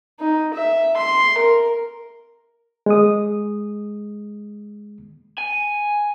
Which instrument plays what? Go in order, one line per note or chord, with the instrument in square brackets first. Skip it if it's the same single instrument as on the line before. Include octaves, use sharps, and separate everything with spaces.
[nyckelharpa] D#4
E5
C6
A#4
[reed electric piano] G#3 D#6
[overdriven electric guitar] G#5